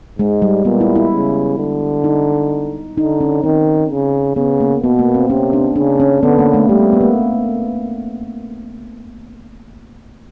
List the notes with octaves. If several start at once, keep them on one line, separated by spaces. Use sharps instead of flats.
G#2 G#3
G3
A#2 B3
E4
E4
C#3
D3
D#4
D3 D#4
C#4
D#3 C4
C#3
C#3 B3
A#3
B2 B3
A#3
C4
C3 C#4
D4
C#3 D4
C#4
D3 B3
A#3
A3
G3 A3
B3
A#3